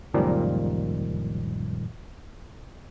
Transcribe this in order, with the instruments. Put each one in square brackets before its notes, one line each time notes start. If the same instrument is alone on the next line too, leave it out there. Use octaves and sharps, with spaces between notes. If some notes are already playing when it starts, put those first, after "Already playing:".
[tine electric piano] C#2 F#2 A#2 D#3 F3 G3